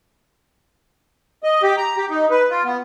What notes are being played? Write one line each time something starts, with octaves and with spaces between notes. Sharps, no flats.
D#5
G4
A#5
G4
D#4
B4
F4
B3